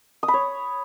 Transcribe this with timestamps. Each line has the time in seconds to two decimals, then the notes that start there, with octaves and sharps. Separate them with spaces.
0.23 D#6
0.28 B5
0.34 C#5